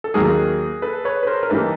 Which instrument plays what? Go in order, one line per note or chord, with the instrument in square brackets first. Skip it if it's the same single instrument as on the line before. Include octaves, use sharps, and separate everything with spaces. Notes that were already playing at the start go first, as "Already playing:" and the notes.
[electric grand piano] A4
[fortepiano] D#2 D#3 F#3 A#3 [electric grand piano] G#4 A#4
[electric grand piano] A4 B4
B4 C#5
B4
A#4 C5
A#4
[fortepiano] E3 G3 A#3 D#4 [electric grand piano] A4 B4